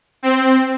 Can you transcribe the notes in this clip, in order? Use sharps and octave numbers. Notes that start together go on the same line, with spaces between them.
C4